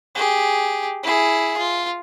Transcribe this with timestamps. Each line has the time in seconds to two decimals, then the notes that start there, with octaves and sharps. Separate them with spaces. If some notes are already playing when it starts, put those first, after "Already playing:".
0.15 G4 G#4
1.03 E4 G#4
1.57 F4